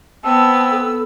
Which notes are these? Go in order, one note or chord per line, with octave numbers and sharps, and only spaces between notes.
B3 C4 A5 E6
A4